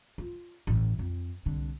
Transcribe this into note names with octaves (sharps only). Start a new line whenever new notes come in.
F4
A1 E3
F2
C2 D3